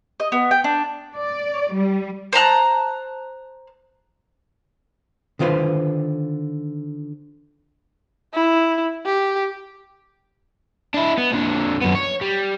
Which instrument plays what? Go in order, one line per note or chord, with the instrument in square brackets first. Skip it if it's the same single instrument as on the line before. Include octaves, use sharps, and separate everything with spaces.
[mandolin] D#5
B3
G5
D4
[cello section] D5
G3
[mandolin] C5 A5 A#5 F#6
[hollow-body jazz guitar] D3 D#3 F4 B4 C5
[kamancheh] E4
G4
[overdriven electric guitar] D4 E4
B3
A#2 D3
F#2 B3
C#5
G3